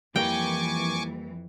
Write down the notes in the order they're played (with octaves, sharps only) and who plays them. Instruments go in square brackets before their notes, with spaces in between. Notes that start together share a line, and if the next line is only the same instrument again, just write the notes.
[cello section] F2 E3 [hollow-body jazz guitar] G3 A#3 [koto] G5 [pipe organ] G#5 C#6 D6